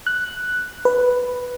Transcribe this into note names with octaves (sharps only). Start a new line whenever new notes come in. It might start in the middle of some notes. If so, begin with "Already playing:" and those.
F#6
B4